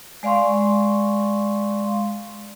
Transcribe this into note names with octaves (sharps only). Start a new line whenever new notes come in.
G#3 D5 F5 C6 C#6